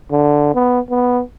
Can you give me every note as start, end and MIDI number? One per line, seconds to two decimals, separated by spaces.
0.11 0.53 50
0.55 0.80 59
0.90 1.22 59